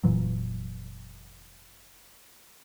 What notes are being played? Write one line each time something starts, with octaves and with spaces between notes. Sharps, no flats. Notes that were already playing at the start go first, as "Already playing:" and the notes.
F1 A#2 E3 F#3